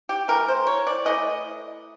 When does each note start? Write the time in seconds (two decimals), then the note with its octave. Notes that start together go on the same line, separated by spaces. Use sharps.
0.09 G4
0.28 E3 A3 A#4
0.48 C5
0.67 C#5
0.87 D5
1.05 E3 A3 D#5